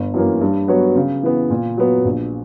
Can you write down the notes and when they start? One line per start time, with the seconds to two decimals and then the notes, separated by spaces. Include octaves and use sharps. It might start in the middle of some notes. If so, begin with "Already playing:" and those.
Already playing: G1
0.14 F#2 E3 A#3
0.41 G2
0.68 F#3 B3 F#4 C#5
0.95 C#3
1.23 E3 B3
1.50 A#2
1.77 F#3 B3
2.05 A#1